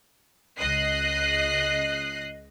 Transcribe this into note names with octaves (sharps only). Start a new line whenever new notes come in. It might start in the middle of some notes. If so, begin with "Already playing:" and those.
C#2 D#5 F#6 C7